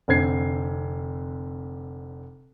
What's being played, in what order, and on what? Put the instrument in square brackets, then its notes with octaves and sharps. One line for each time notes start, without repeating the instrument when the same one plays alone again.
[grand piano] F1 D3 C4 G#6 C7